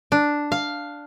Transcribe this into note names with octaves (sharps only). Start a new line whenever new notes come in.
D4
F5